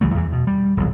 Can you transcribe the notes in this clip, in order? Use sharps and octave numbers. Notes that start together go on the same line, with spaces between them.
C#2 E3 G3 A3
E2 E3
B2
G3
D#1 B1